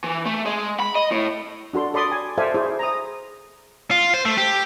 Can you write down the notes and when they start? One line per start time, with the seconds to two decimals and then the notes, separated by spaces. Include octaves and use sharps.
0.04 E3
0.26 A3
0.46 G#3
0.80 B5
0.95 D#5
1.11 A2
1.74 D4 F#4 A4 C6
1.94 A4 D5 B5 C6 D#6
2.12 G#5
2.38 A4 C5 D5 E5 F5 G#5
2.54 E4 G#4 C5
2.79 A#5 D#6
3.91 F4
4.14 C5
4.25 A3
4.38 G4